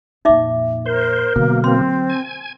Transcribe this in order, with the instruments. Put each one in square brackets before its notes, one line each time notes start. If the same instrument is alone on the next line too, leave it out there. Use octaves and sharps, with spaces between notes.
[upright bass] F2 A#2 [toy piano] D#4 E5 D6
[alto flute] A#4 [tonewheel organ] C5
[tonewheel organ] B2 A#3 [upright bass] D3 F#3
[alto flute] C4 [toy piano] C6
[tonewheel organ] G#5